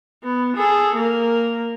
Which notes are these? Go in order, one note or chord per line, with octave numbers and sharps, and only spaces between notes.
B3
G#4 A4
A#3 A#4